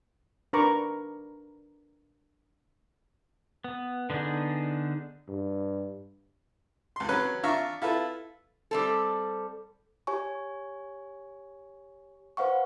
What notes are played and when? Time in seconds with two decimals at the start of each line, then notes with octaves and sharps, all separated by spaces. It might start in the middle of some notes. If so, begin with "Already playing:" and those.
0.53 D4 A#4 B4 A#5 C#6 D6
3.64 B3
4.10 D3 B3 D4 D#4 G#4
5.28 G2
6.96 C#2 C6
7.09 F#3 C#4 B4 F#6
7.43 D4 F4 E5 A#5 C#6 F6
7.82 E4 F4 A4 B4
8.71 G3 C4 A4
10.07 G4 C#5 G#5 C#6
12.37 B4 C5 F5 F#5 C#6